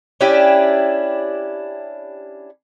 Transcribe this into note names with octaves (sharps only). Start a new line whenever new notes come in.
C#4 D4 E4 G4